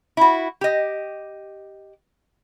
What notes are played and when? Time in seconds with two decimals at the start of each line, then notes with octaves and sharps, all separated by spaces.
0.17 E4 F#4
0.61 G4 D#5